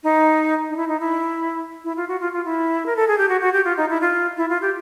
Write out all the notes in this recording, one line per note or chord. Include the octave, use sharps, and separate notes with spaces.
D#4
D#4
E4
D#4
E4
E4
F4
F#4
F4
F4
E4
A#4
A4
G#4
G4
F#4
F#4
G4
F4
D#4
E4
F4
E4
F4
G4